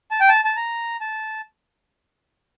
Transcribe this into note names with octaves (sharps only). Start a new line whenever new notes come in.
A5
G5
A5
A5
A#5
A5